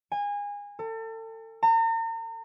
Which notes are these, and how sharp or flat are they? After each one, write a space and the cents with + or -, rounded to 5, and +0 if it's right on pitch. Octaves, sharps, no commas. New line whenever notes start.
G#5 -25
A4 +35
A#5 -40